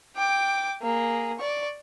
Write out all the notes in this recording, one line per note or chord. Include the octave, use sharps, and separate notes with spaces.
G5 D6
A#3 G#4
D5 C#6